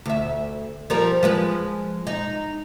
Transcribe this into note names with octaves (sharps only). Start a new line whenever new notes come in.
D2 E5
F3 G3 A#4
F3 G#3 B4
D#4